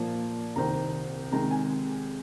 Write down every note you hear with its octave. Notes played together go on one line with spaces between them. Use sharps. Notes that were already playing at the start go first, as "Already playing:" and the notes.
Already playing: A#2 F3 A#3
C2 C3 D#3 C4 A#5
C3 D#3 G#3 A#5
G#5